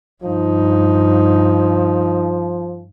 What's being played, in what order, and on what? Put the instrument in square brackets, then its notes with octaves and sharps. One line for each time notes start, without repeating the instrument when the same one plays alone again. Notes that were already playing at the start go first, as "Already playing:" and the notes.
[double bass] G2 D#4 [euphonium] F3